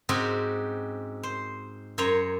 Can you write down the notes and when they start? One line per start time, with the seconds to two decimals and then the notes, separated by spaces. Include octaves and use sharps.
0.09 G#2 C4 C#4 D#4 F#4 G4
1.23 C5
1.98 F#2 C5 C#5 A#5